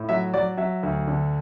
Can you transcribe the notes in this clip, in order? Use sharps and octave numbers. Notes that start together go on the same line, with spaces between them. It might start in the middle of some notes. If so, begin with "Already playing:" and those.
Already playing: A2
F#3 E5
F#3 D5
F#3 E5
D2
D3